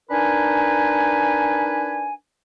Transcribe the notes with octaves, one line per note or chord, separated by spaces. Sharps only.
D4 D#4 A#4 B4 G#5